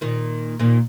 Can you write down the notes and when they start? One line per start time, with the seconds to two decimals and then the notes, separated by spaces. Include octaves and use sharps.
0.01 A#2 D#3
0.59 A#2 D#3